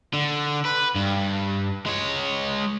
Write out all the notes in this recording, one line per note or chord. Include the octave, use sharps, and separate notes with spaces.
D3
B4
G2
G#3 C#5